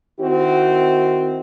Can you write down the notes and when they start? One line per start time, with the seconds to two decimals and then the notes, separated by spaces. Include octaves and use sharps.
0.20 D#3 C4 E4 F#4